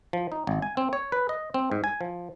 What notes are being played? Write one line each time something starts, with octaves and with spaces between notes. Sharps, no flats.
F3
D#4
G#1
G#5
C4
C#5
B4
D#5
C4
G#2
G#5
F3